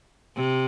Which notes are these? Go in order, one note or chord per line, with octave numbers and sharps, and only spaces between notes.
C3